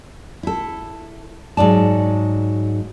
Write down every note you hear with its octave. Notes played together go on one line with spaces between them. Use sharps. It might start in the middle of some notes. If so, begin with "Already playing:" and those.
E4 A4
G#2 F#3 D5 A5